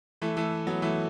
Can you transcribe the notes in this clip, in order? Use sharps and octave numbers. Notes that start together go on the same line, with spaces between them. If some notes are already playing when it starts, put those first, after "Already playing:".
E3 A3
E3 A3
F#3 B3
E3 A3